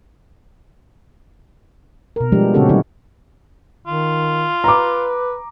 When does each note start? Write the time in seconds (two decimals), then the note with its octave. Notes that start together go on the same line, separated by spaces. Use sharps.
2.16 B2 A#4
2.32 F3 G3 G#3 B3 D4 G4
2.54 A#2 C#3 C#4 F#4 G4 A4
2.69 D3 F#3 G3 D#4 E4 F#4
3.87 D#3 F4
4.64 B4 A#5 D6